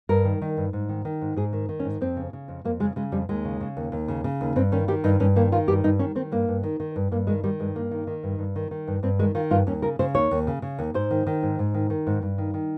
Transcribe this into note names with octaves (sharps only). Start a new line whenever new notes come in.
G2 A#4
D#3
D#3
G2
G#2
D#3
D#3
G#2
G#2 G#4
D#3
D#3
C#4
G#2
F2 C4
C#3
C#3
F2
F2 A#3
C#3 G#3
C#3 G#3
F2 G3
D#2 G#3
C#3
C#3
D#2
D#2
C#3
C#3
D#2
G2 C4
D#3 C#4
D#3 G4
G2 D#4
G2 C#4
D#3 A#3
D#3 F4
G2 G4
G2 D#4
D#3 C#4
D#3 C4
G2 A#3
G2
D#3
D#3
G2
G2 A#3
D#3 G#3
D#3 G3
G2 G#3
G2 A#3
D#3
D#3
G2
G2
D#3
D#3
G2
G2 C4
D#3 G#3
D#3 F4
G2 F4
D#2 C#4
C#3 A#4
C#3 C5
D#2 C#5
D#2
C#3
C#3
D#2
G#2 C5
D#3
D#3
G#2
G#2
D#3
D#3
G#2
G2
D#3
D#3